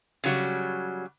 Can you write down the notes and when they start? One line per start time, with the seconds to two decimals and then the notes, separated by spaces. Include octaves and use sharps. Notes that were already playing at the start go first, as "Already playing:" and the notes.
0.24 C#3 F#3 G3